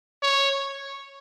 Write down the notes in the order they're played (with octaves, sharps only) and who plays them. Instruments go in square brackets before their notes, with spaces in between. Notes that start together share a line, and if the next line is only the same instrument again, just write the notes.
[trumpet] C#5